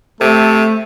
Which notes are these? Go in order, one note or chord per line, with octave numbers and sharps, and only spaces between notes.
C3 A3 A4